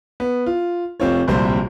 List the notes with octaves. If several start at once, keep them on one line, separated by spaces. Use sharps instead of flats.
B3
F4
F1 C4 F4 C#5
D1 A#1 C3 G3 C5